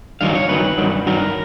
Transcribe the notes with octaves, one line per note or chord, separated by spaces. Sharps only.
G2 D#3 F#3 F5
C#5
G2 D#3 F#3 B4
G2 D#3 F#3
G2 D#3 F#3 A#4